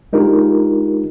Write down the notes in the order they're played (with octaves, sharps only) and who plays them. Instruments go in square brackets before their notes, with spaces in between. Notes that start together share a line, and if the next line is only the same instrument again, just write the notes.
[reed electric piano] G#3 D4 D#4 F4 G4 A#4